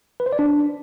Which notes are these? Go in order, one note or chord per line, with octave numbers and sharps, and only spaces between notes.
B4
C5
D5
D4